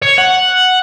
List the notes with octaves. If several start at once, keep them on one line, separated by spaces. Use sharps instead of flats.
C#5
F#5